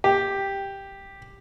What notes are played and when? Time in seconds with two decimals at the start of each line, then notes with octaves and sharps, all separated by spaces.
0.04 G4